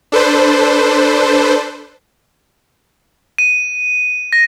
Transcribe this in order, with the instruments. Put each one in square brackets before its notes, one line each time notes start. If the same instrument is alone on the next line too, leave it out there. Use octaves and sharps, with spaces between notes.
[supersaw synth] D4 A4 B4 C5
[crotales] D#7
A#6